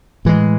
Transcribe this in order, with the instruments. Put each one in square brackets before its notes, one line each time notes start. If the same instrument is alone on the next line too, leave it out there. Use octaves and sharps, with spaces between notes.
[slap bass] A2 E3 G#3